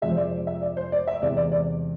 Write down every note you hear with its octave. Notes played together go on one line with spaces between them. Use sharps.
F2 C3 F3 G#3 E5
C5
D5
E5
D5
C5
D5
E5
E2 C3 G#3 D5
D5
D5